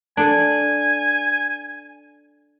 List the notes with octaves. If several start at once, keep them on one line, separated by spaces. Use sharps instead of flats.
D4 A4 G#5